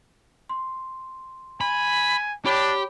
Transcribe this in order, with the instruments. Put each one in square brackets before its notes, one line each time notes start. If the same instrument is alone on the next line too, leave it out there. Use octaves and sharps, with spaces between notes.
[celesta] C6
[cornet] G#5 [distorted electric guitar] B5
[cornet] D4 [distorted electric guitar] G4 [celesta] C#5 B5